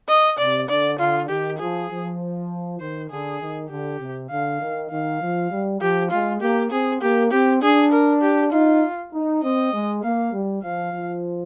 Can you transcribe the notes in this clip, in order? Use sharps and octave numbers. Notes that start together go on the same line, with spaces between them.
D#5
C3 D5
D3 D5
D3 F4
D#3 G4
F3 G#4
F3
D#3 C5
D3 G#4
D#3
D3 G4
C3
D3 F5
D#3
D#3 F5
F3
G3
F3 G4
G#3 F4
A#3 G4
C4 G#4
A#3 G4
C4 G4
D4 G#4
A#4
G4
D#4 F4
D#4
C4 D#5
G#3
A#3 F5
G3
F3 F5
F3